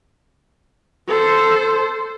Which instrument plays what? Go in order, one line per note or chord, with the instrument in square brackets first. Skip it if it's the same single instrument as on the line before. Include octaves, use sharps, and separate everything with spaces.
[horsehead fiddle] A4 C5